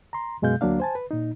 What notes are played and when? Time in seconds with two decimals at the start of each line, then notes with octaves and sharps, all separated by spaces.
0.13 A#5 C6
0.42 F#2 B2 G#3 F5 G6
0.61 D2 F#3 A#3 D4 F5
0.80 C5 G#5 A5
0.95 B4
1.11 A#2 D#4